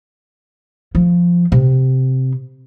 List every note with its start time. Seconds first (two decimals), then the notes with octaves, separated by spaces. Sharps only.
0.95 F3
1.52 C3